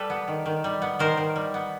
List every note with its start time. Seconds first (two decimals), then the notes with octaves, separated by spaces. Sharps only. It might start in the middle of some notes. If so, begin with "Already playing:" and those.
Already playing: G3 A4 B4
0.10 B3
0.28 D#3
0.46 D#3
0.64 G3
0.82 B3
0.99 D#3 A#4 C5
1.17 D#3
1.36 G3
1.54 B3